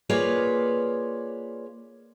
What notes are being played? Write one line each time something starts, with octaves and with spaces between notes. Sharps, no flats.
A#3 F4 G#4 B4 C#5 D5